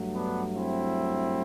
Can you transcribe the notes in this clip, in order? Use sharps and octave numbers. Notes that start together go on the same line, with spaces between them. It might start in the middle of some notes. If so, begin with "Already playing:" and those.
Already playing: G2 F#3 A3
B3 D4
C4 E4